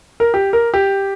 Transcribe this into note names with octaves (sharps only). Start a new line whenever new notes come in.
A#4
G4
A#4
G4